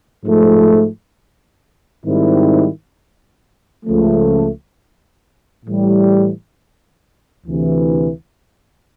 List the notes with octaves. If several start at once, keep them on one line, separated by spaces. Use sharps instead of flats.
G#2 F3 A3
G#2 D#3 G3 C4 E4
C#2 C#3 F3 A3
A2 E3 G3
D2 C3 E3